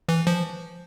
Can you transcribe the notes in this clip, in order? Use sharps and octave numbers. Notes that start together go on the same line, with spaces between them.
E3
F3